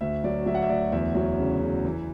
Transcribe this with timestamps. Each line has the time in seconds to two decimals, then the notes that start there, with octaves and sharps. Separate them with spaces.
0.01 D2 E5
0.24 F#3 D5
0.46 F#3 E5
0.55 F#5
0.62 E5
0.69 D2 D5
0.92 E2 E5
1.15 F#3
1.39 C#3
1.62 C#3
1.85 E3